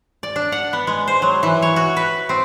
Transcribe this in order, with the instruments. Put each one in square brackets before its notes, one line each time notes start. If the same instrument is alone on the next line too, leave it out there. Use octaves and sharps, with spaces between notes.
[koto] D5
D4
F#5
B3
G#3
C5
F#3
E3
C#5
F#4
B4
C4